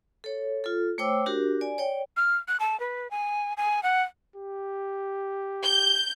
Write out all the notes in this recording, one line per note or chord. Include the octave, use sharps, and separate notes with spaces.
A4 C#5
F4 A4
A3 C5 C#5 G5 D6 E6
D4 F#4 G4 A#4
D5 G#5
C#5 D5 G5
F6
F#6
A5
B4
G#5
G#5
F#5
G4
G6